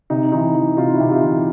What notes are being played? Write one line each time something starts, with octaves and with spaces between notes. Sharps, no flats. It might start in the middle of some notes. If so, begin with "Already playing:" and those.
C3 D#4
E3 D#4
E3
C3 D#4 F4
E4 F#4
C3
F4 G4
E3